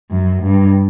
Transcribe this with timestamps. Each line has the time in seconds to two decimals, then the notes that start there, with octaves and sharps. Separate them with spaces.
0.11 F#2
0.43 G2